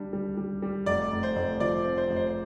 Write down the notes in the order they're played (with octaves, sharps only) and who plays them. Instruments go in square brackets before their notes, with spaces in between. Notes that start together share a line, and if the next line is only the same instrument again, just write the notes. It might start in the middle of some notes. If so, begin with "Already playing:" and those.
Already playing: [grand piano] G3 D4
G3
G3
G3
[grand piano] F1 [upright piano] D5
[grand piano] F1
[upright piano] C5
[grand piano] F1
[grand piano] F3 [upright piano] D5
[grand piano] C4
[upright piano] C5
[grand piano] F1
[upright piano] C5
C5